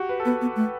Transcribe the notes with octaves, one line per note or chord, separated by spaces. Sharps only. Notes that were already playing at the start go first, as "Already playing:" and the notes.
Already playing: F#4 G4
B4
A4
B3 B4
B3
A3